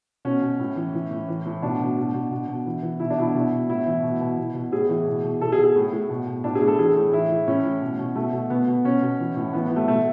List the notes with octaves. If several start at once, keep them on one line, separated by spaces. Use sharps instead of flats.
B2 C#4
B2
A2
E3
E3
A2
E3
A2
B2 D4
B2
B2
B2
B2
B2
E3
E3
B2 E4
D4
B2 E4
B2
B2
A2 E4
E3
B2
B2
B2
B2
A2 G#4
E3
B2
B2
B2 A4
G#4
B2
G#4
A2
A2
B2
B2
A2 D4
G#4
A2
A4
E3 G#4
A2
E3 E4
E3
A2 C#4
E3
B2
B2
B2 A3
B2
B2 B3
B2
B2 C#4
B2
E3
A2
E3 B3
B3
E3
A3
B2 A3